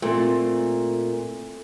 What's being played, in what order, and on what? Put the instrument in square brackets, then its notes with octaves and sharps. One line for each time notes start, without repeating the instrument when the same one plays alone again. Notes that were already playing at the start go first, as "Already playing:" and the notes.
[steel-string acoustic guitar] A#2 [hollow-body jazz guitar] A3 C4